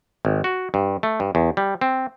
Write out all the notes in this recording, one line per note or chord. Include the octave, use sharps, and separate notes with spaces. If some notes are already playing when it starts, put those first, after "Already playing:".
G#1
F#4
G2
A3
G2
E2
G3
C4